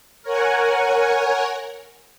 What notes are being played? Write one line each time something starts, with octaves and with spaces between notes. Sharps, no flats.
A#4 C#5 F#5 G#5